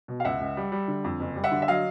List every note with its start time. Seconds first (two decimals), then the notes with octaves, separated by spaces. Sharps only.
0.08 B2
0.20 F5
0.25 C#2 E5 F#5
0.40 C#2
0.57 G3
0.72 G3
0.88 D3
1.04 F2
1.20 F#1
1.36 G3
1.44 E5 F#5
1.52 D3
1.62 E5
1.68 F#3 D#5 F5